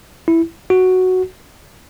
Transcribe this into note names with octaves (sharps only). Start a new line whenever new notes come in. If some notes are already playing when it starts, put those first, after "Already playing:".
E4
F#4